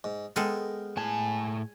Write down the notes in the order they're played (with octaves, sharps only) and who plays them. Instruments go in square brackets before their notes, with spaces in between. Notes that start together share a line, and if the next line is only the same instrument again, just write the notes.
[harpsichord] G#2
[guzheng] G#3 A4 [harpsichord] B3 A#4 G5
[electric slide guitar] A2 A5 [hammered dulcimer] G#5